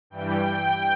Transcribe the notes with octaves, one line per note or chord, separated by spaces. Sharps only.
G2 E3 G3 G5